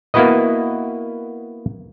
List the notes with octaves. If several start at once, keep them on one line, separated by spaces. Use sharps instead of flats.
A#3 B3 E4 F#4 B4 D#5